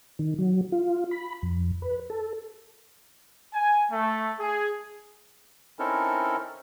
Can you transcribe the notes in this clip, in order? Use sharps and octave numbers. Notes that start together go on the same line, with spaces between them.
D#3
F#3
F4
B5
F2
B4
A4
G#5
A3
G#4
C4 C#4 D#4 E4 A4 A#4